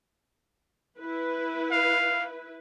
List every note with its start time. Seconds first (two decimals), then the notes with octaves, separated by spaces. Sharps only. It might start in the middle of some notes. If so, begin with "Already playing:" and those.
0.99 E4 B4
1.71 F5